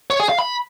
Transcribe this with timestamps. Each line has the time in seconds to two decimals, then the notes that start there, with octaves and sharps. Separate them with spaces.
0.10 C#5
0.20 G#4
0.29 F5
0.39 B5